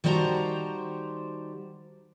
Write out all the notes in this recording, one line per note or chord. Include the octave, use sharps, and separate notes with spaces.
D#3 G3 F#4 C5 A5 A#5